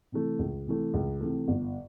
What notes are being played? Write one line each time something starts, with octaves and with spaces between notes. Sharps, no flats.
C3 E3 A3
C#2
C3 E3 A3
C#2
C3 E3 A3
G1